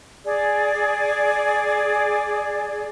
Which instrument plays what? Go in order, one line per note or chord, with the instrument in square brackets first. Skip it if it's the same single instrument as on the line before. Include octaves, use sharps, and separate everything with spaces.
[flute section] G#4 D5